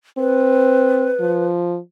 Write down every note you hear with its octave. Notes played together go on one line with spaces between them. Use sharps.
C4 B4
F3